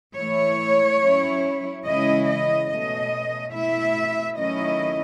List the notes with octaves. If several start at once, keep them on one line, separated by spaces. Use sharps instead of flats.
E3 A3 E4 C#5
F#3 C#4 E4
C#3 E3 G#3 C#4 E4 D#5
D#5
B2 A3 C#4 D#5
B2 A3 E4 E5
D#3 F#3 A3 C#4 E4 D#5